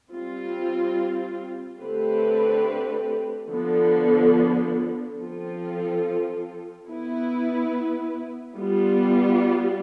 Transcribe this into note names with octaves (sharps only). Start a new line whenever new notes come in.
G3 C4 F4
D3 A3 C4 G4 B4
D3 F3 B3
F3 C4 F4 A4
B3 E4 B4
G3 B3 F4